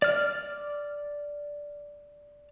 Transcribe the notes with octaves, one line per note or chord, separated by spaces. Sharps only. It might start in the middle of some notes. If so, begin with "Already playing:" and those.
D5 F6